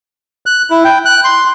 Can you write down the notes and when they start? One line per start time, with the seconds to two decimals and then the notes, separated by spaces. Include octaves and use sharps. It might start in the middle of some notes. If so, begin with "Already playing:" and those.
0.46 F#6
0.70 E4
0.84 G5
1.05 F#6
1.24 C6